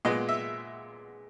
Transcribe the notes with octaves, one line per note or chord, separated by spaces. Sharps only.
A#2 G#3 B3 D#5
E5